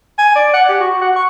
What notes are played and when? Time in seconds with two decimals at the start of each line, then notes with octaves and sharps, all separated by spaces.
0.18 G#5
0.35 D5
0.53 F#5
0.69 G4
0.80 F#4
1.01 F#5
1.16 C#6